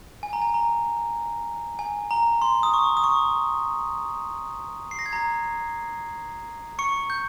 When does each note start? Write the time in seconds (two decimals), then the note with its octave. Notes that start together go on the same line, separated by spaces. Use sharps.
0.23 G#5
0.33 A#5
0.42 G#5
0.54 A#5
1.79 G#5
2.11 A#5
2.42 C6
2.63 D#6
2.74 C#6
2.97 D#6
3.04 C#6
4.91 C7
4.99 A#6
5.06 G#6
5.12 A#5 A#6
6.79 C#6 C#7
7.10 G6